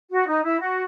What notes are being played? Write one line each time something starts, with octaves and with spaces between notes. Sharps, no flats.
F#4
D#4
E4
F#4